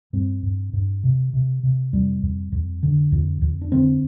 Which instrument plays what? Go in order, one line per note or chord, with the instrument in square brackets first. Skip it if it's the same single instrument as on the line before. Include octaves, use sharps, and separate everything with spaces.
[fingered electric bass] G2 C4
G2
G2
C3
C3
C3
F2 G3
F2
F2
D3
F2
F2
D4
D3 C4